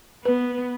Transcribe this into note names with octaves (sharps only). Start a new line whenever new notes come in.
B3 B4